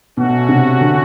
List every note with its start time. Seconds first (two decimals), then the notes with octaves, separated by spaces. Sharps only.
0.17 B2 A3 C#4 F#4
0.49 C3
0.81 D3